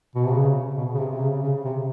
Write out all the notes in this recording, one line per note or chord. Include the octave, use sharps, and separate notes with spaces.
B2
C3
C#3
B2
C#3
C3
C3
C#3
C#3
C3